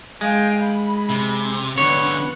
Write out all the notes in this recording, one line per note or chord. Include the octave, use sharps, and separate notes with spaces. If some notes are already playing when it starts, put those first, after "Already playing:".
G#3 F5 G5
B5
C3
E2 D3 B4 C#5 F#5